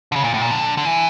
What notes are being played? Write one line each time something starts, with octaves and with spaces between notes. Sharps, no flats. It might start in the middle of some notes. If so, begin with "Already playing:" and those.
D3
C#3
A#2
A2
A#2
D3
D3
E3